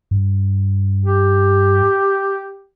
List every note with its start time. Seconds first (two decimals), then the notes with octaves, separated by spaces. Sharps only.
0.11 G2
1.05 G4